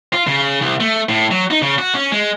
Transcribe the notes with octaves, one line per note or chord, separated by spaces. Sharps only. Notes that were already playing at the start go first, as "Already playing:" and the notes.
F4
C#3
C2
A3
A2
F#3
D#4
C#3
F#4
C#4
G#3